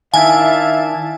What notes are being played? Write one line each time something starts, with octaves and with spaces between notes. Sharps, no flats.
D#3 D4 E4 E5 F5 G#5 A5